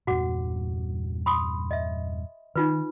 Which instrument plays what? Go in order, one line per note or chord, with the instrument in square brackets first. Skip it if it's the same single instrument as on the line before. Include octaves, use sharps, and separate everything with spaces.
[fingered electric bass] E2 G2 A#2 [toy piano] F#4 F#5 D6
[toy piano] B5 C6 D#6
D#5 E5
[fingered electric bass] D#3 [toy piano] D#4 F4 B4